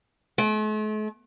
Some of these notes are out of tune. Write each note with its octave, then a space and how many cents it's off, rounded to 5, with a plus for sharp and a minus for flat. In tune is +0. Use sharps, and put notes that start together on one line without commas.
A3 -45